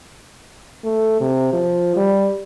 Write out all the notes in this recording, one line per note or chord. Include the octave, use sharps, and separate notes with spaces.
A3
C3
F3
G3